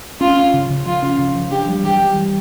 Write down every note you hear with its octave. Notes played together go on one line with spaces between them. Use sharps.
C#4 F4
C#4
C#3
C#3
F3 F4
C#4
C#3
F3
D4 G4
G3
E3 G4
G3
E3